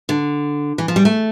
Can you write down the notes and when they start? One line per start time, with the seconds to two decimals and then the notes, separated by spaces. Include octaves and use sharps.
0.09 D3
0.78 E3
0.88 F3
0.96 G3
1.05 A3